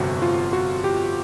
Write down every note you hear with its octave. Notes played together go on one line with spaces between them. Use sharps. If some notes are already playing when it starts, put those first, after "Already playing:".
Already playing: G1 F2 C3 F#4 C5
F4
F#4
G4